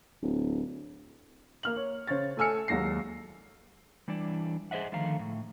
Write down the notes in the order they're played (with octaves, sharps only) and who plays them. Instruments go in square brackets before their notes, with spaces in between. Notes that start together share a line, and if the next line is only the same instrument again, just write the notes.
[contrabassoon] D1
[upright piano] A#3 F6 F#7
C#5
C#3 C5 C#5 A6
A3 A4 G#5 E6 F6 C#7
D#2 F#3 G#3 A#6 C7
[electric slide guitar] E3 G3 D4 E4 D5
G#4 C5 D#5 E5 F#5
D3 D#3 F3 A3 F5 A#5
A2 A3